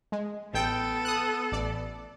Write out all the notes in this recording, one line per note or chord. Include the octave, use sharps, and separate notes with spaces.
G#3
A1 B3 A4 G5
D#6 F#6
A1 D5